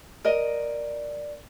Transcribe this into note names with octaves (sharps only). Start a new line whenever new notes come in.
A#4 D5 D#5